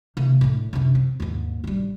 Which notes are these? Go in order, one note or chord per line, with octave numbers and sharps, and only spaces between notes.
C3 A#3
A2 D3
F#2 C3
C4
D#2 G#2
A1 G3